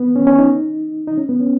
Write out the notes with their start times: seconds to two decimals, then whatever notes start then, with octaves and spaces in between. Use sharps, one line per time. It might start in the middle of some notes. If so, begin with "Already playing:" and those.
Already playing: B3
0.16 C#4
0.27 C#4
0.39 D#4
1.08 D#4
1.17 C#4
1.29 B3
1.40 C#4